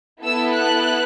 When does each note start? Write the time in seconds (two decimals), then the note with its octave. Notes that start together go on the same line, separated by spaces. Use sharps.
0.22 B3 E4 A4 E6
0.54 F#6